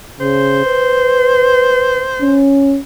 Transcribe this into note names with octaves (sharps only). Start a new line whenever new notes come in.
C#3 C5
B4
C#4